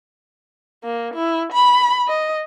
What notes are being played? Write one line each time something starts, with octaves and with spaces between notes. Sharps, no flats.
A#3
E4
B5
D#5